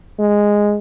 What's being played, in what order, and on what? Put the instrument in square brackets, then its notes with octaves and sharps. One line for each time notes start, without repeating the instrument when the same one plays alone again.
[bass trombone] G#3